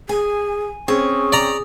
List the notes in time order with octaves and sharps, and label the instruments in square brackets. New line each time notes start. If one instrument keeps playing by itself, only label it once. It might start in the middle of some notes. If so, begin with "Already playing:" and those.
[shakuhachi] G#4 [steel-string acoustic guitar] G#5
[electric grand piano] C4 C#4 [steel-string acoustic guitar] G#4 [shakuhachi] C#6
[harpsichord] D5 A#5